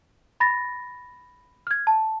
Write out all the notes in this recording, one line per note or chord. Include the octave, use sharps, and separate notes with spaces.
B5 A6 A#6
F6 G#6
A5